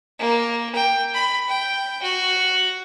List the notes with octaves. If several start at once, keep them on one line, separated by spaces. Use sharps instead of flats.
A#3
G5
B5
G5
F#4